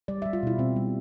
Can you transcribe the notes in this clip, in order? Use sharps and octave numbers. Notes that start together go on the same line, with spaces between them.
G3 D5
G3 E5
F4
B2 E4
B2 C4
G3